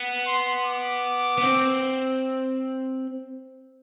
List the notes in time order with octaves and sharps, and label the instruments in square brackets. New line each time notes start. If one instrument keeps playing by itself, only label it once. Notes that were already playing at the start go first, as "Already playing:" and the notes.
Already playing: [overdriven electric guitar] B3
[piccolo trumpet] C6
D6
[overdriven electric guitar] B3
C4